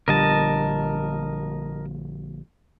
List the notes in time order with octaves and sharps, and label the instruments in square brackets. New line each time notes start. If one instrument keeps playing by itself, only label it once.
[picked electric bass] A#1 D3 G3 [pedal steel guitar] A#4 D#5 A5